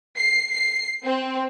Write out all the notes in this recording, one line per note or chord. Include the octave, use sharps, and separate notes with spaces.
C7
C7
C4